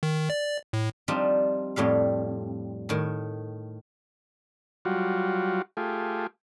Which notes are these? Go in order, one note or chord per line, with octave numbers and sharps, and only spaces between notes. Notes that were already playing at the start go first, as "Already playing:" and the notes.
D#3
D5
A2
F3 G3 C4 D4 D#4 F4
F2 A2 G3 F5
A2 D#3
F#3 G3 F4 F#4
A3 F4 G4 G#4